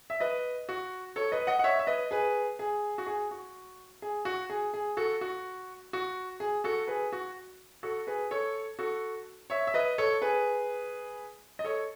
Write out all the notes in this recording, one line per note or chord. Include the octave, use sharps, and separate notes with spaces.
E5
B4 D#5
F#4
A4 C#5
B4 D#5
D#5 F#5
F#5
C#5 E5
E5
B4 D#5
G#4 B4
G#4
F#4
G#4
F#4
G#4
F#4
G#4
G#4
F#4 A4
F#4
F#4
G#4
F#4 A4
G#4 B4
F#4
F#4 A4
G#4 B4
A4 C#5
F#4 A4
C#5 E5
E5
B4 D#5
A4 C#5
G#4 B4
D#5
A4 C#5